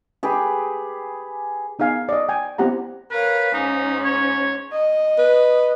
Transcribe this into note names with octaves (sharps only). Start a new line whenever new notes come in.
G4 G#4 B4
B3 D#4 G#4 F5 G#5
D5 D#5
G5 G#5
B3 C4 E4 G4 F#5 A#5
A#4 B4 C#5 F5
G#2 C#4 D#4
C#5
D#5
B4